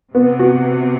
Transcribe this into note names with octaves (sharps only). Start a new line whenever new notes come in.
C3 B3
F#4